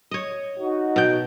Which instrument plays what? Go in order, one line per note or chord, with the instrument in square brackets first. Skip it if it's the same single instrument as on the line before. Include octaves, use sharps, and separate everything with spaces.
[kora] C#5 D#5
[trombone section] D#4 F#4
[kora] B2 G5